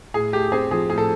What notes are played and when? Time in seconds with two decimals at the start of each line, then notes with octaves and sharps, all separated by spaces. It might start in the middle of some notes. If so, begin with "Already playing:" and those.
0.14 A2 G#4
0.33 A3 G4
0.52 C4 G#4
0.71 F3 G#4
0.89 A2 G#4
0.98 A4